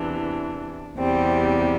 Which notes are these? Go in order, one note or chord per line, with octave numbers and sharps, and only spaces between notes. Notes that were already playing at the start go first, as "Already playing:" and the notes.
Already playing: E2 C3 E3 D4
E2 C3 G3 C4